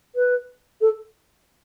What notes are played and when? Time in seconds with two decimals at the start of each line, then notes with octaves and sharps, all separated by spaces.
0.15 B4
0.81 A4